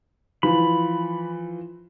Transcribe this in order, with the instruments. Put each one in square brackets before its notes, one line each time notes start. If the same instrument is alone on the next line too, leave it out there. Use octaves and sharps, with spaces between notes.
[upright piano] E3 F3 [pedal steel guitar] B5